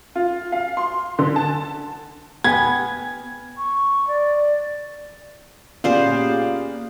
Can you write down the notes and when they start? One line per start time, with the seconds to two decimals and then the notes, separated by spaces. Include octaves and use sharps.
0.16 F4
0.52 F5
0.77 C6
1.19 D3
1.36 A5
2.44 B3 G5 G#5 G#6
3.57 C#6
4.08 D5
5.84 A#2 B3 C#4 G4 G#4 C5 D5 F5